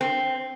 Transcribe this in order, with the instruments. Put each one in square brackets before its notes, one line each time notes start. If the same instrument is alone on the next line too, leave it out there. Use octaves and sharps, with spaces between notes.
[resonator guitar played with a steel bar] C4